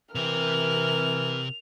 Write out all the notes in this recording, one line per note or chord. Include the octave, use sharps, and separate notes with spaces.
C3 E3 G4 A#4 F6 F7